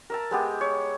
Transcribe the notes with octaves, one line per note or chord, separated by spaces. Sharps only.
A#4 E5 A5
G#3 B3 G4
C#5